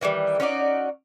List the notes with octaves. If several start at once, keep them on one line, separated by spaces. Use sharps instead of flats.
D#3 E3 F#3 G3
C#4 D#4 F#4 D5